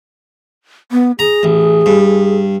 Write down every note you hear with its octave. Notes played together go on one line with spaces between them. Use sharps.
B3
G#4 A#5
A1
G2